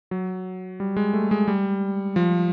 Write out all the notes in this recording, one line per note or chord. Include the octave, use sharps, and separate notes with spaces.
F#3
G3
G#3
A3
G#3
G3
F3